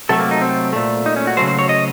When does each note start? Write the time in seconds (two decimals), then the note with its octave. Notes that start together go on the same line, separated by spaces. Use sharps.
0.09 C3 F#3 A3 A4
0.19 A#3
0.31 D#4
0.42 C4
0.73 A#2 A3
1.06 D#4
1.16 C#4
1.27 F#4
1.37 C#3 F#3 A3 C5
1.48 C5
1.59 C#5
1.69 D#5